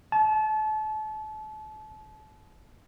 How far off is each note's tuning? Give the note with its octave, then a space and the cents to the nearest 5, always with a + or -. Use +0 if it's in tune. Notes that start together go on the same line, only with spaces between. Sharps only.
A5 -30